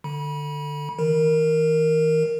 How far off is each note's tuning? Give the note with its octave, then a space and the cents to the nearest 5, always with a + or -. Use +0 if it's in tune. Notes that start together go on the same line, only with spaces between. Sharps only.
D3 +10 B5 -30
E3 -40 A#4 -5